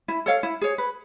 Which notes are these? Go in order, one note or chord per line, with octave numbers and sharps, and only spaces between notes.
E4
A4 C#5 F5
E4
G#4 C#5
B4